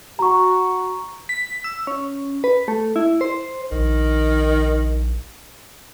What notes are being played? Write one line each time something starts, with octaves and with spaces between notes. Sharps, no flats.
F#4 A#5 C#6
B6
E6
C#4
B4
A3
E4
C5
A#1 D#3